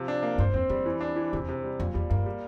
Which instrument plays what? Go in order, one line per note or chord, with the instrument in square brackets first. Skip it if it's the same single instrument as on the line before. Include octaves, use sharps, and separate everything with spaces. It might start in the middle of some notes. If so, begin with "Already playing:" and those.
Already playing: [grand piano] C3 F3
D4
A#3
[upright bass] G2 [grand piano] C5
[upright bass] E2 [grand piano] C4
[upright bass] E2 [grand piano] G3
[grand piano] E3
D4
E3
[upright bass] E2 [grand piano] C3
[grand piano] C3
G3
[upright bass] F2 [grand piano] A#2
[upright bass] E2 [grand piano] G3
[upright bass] G2 [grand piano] A#3
[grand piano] G3